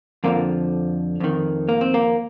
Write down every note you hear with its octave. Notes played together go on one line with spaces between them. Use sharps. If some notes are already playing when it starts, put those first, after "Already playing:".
F2 D3 F3 A#3
F2 D#3
A#3
C4
A#3